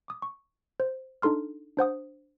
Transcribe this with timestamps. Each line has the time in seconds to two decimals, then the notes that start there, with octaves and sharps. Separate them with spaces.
0.08 D6 D#6
0.22 C#6
0.80 C5
1.22 D4 D#4 A4 C6 F6
1.77 D4 C5 F#5 D#6